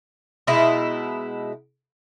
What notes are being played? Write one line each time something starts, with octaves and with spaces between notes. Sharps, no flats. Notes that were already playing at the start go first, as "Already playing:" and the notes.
B2 G#3 D#4 E4